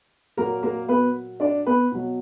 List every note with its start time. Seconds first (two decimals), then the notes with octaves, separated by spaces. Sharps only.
0.37 A#2 F#3 A#3 A#4
0.63 A#3 A#4
0.88 B3 B4
1.40 D4 D5
1.66 B3 B4
1.92 B2 F#3